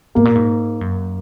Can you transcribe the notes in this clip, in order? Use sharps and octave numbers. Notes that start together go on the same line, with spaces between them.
G#2 A#3
A#2
G#2
F#2